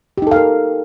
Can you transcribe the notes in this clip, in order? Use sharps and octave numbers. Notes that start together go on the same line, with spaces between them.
D#4 G4 A4 A#4 F5